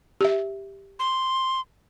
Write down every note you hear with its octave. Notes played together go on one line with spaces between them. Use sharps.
G4 E5
C6